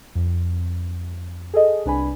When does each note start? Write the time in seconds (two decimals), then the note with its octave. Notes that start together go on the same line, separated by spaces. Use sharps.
0.15 F2
1.54 G#4 A4 D#5
1.86 C2 D4 B4 G#5 B5